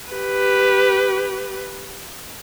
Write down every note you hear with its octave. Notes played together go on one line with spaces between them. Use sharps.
G4 B4